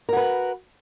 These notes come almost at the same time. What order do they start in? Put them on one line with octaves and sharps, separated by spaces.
A#4 F#4 B4